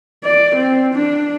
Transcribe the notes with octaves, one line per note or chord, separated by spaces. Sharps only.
D5
C4
D4